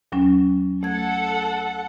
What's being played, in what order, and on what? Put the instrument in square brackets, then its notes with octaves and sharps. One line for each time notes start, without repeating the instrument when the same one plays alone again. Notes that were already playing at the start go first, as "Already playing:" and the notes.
[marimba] D#2 F#3 C#4
[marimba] A3 G#6 [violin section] A4 F#5